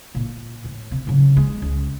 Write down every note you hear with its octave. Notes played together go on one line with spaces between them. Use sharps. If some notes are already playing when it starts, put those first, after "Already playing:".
A#2 F4
A2
C3
C#3 F#3
G#3
C#2